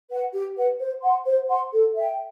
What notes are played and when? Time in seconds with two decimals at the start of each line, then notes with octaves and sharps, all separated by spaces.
0.10 B4 F#5
0.33 G4
0.57 B4 F#5
0.79 C5
1.03 F#5 C6
1.25 C5
1.50 F#5 C6
1.73 A4
1.95 E5 G5